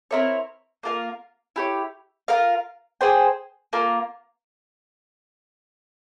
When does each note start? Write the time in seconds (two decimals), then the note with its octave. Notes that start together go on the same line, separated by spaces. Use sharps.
0.11 C4 E4 A#4 C#5
0.83 A#3 F4 A#4 F5
1.56 E4 G4 C#5
2.28 F4 A#4 F5
3.01 G#4 C5 G5
3.73 A#3 F4 A#4